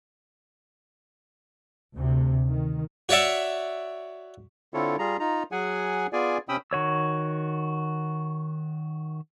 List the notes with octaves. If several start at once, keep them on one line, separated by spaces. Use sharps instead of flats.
D2 C3
D#3
F#4 C#5 D5 E5 F#5
D3 C4 E4 F4 A4 C#5
G3 F4 G#4 A#5
D#4 F4 A#5
F#3 G#4 F#5 G#5
B3 F4 G#4 D5 G#5
C3 C#4 G5 B5 D#6 E6
D#3 F#4 C#5 E6